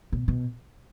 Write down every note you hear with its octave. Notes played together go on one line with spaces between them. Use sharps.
B2
B2